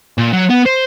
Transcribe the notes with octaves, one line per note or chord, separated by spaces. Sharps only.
A#2
F#3
B3
C5